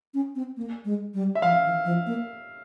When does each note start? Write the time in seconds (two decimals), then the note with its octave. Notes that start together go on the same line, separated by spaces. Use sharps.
0.14 C#4
0.36 C4
0.57 A#3
0.85 G#3
1.14 G3
1.35 E5
1.42 F3 F5
1.64 E3
1.85 F3
2.07 A#3